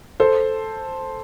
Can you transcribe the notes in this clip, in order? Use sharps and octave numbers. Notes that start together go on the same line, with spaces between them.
A4 C5